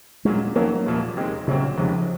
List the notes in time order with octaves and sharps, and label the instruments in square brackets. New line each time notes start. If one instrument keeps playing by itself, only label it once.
[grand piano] A#2 F#3 C#4 [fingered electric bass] G#3
[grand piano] F2 D#3 F#3 C#4 [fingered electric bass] A#3
[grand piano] C2 A#2 F3
D#2 D#3 G#3 C4
[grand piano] C2 A#2 F#3 C4 [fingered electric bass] C#3
[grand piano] C#2 C3 D#3 G#3 C#4 [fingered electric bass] F3